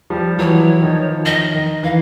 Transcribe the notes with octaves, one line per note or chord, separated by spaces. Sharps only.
F3 G3
E3 F#3 C#5
D#3 F3
D#3 D#5
D#3
E3 F5